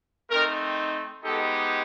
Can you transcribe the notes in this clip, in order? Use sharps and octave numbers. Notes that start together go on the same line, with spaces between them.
A3 C4 D#4 A#4
G#3 B3 D#4 G4 A4